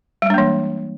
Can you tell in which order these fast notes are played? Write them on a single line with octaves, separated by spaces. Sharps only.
G3 G#3 D4 A#3 E3